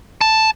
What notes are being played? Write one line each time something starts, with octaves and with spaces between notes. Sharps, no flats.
A5